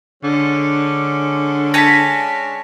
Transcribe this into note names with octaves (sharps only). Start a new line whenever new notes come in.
D3 G#3 C#4 D4
C#5 G#5 A5 A#6 B6